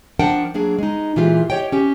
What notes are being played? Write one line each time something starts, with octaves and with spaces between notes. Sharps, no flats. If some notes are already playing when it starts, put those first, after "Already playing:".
F3 D4 A#4 F#5 G5 A5
F#3 A#3 D4 G#4
G#3 D#4
A#2 E3 G#3 A#3 F4 G4
G4 C#5 D#5 G5
C#4 G4